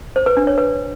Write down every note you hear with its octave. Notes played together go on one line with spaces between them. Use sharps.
C5
B4
D4
C#5
B4